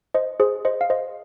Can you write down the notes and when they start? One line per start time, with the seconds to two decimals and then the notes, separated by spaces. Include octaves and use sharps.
0.14 C5 D#5
0.40 G#4 C5
0.65 C5 D#5
0.81 F5
0.90 C5 D#5